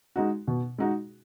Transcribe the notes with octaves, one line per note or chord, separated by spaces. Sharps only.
G#3 D#4 F#4
B2
G#3 D#4 F#4